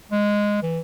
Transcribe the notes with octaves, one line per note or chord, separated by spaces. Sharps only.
G#3
E3